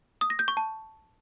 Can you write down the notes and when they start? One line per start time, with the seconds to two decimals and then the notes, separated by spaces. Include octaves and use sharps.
0.21 D#6
0.30 A#6
0.39 G6
0.48 C#6
0.57 A5